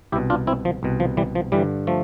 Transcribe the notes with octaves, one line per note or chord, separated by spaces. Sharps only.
C2 B2 E4 G4
D4 F4
C4 E4
F3
C2 B2
F3
E3 G3
F3
G2 D3 E3 G3
F3 A3